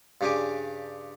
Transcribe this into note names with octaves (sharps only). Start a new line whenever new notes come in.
G2 C#3 D4 G4 G#5 D6